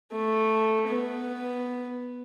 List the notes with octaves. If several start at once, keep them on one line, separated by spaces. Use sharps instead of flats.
A3
B3